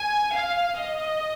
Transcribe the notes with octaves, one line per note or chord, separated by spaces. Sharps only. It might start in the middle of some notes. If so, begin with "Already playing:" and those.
Already playing: G#5
F5
D#5